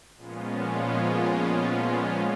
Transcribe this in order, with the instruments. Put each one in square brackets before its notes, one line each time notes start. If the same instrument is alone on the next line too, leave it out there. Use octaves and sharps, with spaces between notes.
[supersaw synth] A#2 F3 G#3 B3 C#4 F4